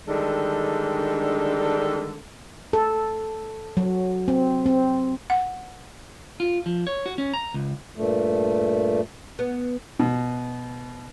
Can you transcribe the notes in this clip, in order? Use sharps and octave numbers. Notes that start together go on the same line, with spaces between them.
D3 D#3 G3 G#3 D4 A4
A4
F#3
C4
C4
F#5
F4
F3
C#5
F#4
C#4
A#5
C#2
G2 A#2 A3
B3
B2